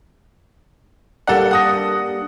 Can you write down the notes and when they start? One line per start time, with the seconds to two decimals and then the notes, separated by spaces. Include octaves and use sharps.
1.27 G3 A#3 D4 A4 F#5
1.51 F#5 D#6 A#6